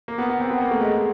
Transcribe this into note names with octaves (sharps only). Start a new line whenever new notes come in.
A#3
B3
B3
C4
B3
A#3
A3
G#3